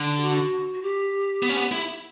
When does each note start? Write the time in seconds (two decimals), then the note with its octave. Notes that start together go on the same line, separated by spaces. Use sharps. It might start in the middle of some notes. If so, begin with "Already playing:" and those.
Already playing: D3
0.17 G4
0.22 F#4
0.74 F#4
0.82 G4
1.42 B3
1.49 C#4
1.57 B3
1.72 E4